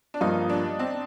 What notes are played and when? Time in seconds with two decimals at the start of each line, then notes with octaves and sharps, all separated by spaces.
0.14 D4
0.21 G2 F3 A#3 D#4 F4
0.49 D4
0.79 C4